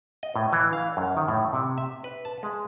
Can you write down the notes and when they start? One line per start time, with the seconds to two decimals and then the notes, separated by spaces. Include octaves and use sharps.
0.23 D#5
0.36 A2
0.53 E3
0.73 F5
0.97 F#2
1.17 D#3
1.28 A2
1.53 C3
1.78 E5
2.04 B4
2.25 A5
2.43 G#3